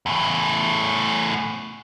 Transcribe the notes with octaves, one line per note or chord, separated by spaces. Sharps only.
E2 A2